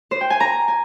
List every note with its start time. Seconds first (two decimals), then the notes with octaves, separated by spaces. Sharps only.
0.11 C5
0.21 G5
0.30 G#5
0.40 A#5
0.68 G#5